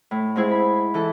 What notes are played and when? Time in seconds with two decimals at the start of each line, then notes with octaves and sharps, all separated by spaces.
0.11 A2
0.36 G#2 C4 E4 G#4
0.51 B5
0.94 E3 A4